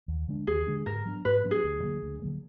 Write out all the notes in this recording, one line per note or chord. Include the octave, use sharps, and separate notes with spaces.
D#2
D3 G#3 D4
D#2 G#4
D3 G#3 D4
G#2 A#4
F#3 B3 D4
G#2 B4
F#3 B3 D4
G#4
D2
D3 F#3 A#3
D2
D3 F#3 A#3